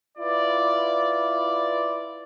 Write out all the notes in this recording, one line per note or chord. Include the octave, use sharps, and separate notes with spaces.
E4 F4 B4 D5